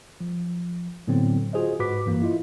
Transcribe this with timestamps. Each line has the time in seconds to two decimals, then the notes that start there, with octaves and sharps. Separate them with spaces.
0.20 F3
1.08 A2 D3 F#3 B3 C4
1.53 F4 F#4 G#4 C5 D#5
1.79 G#2 F#4 B4 D6 B6
2.06 G2 E3 A#3
2.22 E4 F4 D#5